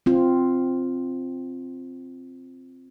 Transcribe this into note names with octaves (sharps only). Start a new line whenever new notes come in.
C4 F4